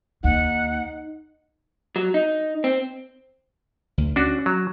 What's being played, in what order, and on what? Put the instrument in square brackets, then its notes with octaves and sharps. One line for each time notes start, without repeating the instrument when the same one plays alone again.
[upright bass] D#2 [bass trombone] D#4 [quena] F#5
[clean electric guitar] F#3
D#4
C4
[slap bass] D2
[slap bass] C#4 [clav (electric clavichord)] D4 F#4
[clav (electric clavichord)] F#3